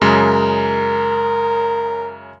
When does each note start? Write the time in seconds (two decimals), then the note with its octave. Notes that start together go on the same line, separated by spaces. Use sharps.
0.02 F#2 C#3 G#3 A#4